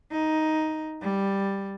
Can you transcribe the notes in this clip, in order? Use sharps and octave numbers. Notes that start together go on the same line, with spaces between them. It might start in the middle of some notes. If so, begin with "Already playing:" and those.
D#4
G3